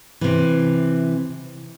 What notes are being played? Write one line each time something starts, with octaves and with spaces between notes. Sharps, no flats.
C3 E3